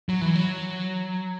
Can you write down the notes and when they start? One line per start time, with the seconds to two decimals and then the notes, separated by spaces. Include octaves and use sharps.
0.09 F#3
0.21 E3
0.35 F#3